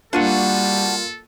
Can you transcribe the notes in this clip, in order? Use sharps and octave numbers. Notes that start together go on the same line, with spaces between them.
G3 A#3 D4 F4 F#4 A4 F#5 D#7